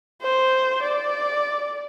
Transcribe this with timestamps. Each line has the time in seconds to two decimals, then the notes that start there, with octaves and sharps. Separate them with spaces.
0.22 C5
0.82 D5